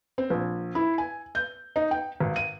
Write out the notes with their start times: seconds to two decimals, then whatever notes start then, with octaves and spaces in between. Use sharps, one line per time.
0.18 C4
0.30 A#1
0.75 E4
0.98 G#5
1.35 G6
1.76 D#4
1.91 G5
2.20 G#1
2.36 D#7